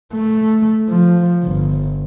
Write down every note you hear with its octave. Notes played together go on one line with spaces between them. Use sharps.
A3
F3
G1